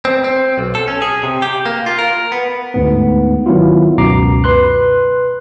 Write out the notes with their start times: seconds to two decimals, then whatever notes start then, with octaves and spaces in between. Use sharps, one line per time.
0.05 C4
0.24 C4
0.58 B1
0.75 A4
0.88 C#4
1.02 G#4
1.23 C3
1.42 G4
1.66 A#3
1.86 F4
1.99 A#4
2.32 B3
2.74 D2 G#2 B3
3.46 D#3 F#3 B3 E4 F4
3.98 C#2 F#2 B2 A#5 D6 C7
4.44 B4 C6 F#6